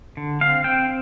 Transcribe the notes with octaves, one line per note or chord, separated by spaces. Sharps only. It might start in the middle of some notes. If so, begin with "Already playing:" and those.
D3
C4 F5
C4 G5